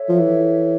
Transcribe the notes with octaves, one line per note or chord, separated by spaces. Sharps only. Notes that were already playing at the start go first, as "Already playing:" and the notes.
Already playing: A4 C#5 E5
F3
E3